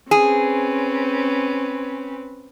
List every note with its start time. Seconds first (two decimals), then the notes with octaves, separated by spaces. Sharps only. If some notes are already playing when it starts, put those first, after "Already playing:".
0.11 C4 C#4 G#4 B4